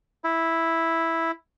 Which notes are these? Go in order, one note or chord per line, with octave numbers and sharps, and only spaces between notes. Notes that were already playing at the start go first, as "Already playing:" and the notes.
E4